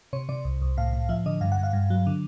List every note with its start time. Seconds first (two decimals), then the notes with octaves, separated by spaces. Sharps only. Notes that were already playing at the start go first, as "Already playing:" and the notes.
0.13 C3 C#5
0.29 C3 D5
0.45 C2
0.62 C2
0.77 A2 F5
0.93 A2
1.09 F3 E5
1.26 D3 D#5
1.41 G2 F5
1.52 F#5
1.58 G2
1.63 F5
1.73 G2
1.90 F#3
2.07 D3